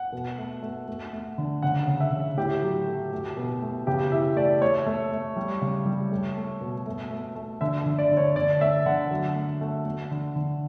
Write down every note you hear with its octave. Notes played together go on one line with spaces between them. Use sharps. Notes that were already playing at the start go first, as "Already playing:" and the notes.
Already playing: F#5
B2
A3
A3
A3
A3
D3
C#3 F#5
C#3
E5
C#3
A2 G4
F#3
A3
A3
B2
A3
C#3 G4
E3 E5
A3 D5
A3 C#5
A3
A3
G3
C#3
G3
A3
A3
B2
A3
A3
A3
D3 E5
E5
D3
D5
D3
C#5
D3 D5
A3 E5
D3 F#5
F#3
A3
A3
A3
D3
D3